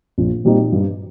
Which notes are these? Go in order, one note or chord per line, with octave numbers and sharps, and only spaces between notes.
A#1
A#2 G3 C4 D#4
G2